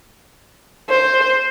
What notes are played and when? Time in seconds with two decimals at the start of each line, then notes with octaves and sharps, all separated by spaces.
0.89 C5